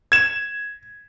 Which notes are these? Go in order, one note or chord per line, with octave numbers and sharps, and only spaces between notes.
G#6 E7